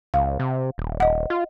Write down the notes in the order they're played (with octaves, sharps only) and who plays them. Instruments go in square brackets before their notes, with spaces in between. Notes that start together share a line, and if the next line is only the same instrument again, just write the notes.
[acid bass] C#2 [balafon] F5
[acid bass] C3
D#1
[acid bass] D#1 [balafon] D#5 F#5
[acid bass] F4